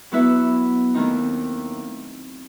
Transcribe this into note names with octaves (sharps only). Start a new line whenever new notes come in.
F#3 B3 E4 B4 E5
D#2 D#3 A3 C4 D#4